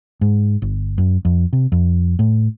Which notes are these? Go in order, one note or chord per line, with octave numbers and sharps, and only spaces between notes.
G#2
G1
F#2
F2
C3
F2
A2